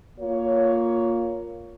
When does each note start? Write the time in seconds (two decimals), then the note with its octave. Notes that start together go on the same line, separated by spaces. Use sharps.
0.19 A#3 F4 C#5